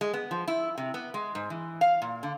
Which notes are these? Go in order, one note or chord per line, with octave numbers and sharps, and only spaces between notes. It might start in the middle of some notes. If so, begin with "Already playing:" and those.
G#3
B3
F3
E4
C3
B3
G#3
G#2
E3
F5
A#2
D3